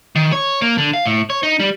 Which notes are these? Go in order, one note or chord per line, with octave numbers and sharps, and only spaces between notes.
D#3
C#5
A#3
D3
F5
A2
C#5
D#4
G3